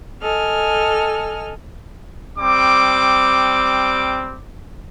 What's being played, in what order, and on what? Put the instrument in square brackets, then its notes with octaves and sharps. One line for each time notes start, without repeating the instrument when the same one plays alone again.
[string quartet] A4 D#5 G#5 F6
[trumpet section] G3 C4 D6